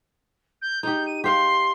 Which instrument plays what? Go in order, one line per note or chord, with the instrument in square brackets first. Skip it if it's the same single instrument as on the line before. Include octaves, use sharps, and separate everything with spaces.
[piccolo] G6
[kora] D#4 G4 [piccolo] G6
[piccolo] D#7
[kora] G4 F5 [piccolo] C6